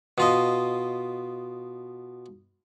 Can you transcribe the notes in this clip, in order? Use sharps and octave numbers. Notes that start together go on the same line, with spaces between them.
B2 F4 D#5